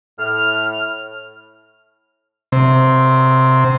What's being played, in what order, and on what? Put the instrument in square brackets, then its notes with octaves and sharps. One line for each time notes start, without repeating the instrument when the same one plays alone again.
[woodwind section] A2 F6
[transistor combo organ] C3